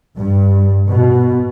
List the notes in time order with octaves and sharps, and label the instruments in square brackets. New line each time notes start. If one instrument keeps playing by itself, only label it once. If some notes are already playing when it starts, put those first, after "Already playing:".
[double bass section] G2
B2